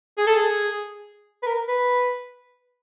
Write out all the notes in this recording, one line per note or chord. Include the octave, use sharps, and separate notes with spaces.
G#4
A4
G#4
B4
A#4
B4